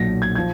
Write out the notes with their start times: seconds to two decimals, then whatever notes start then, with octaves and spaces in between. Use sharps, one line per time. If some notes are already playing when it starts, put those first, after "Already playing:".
Already playing: B1 A#2 F#3 A#6
0.22 G#6
0.35 F3 G#6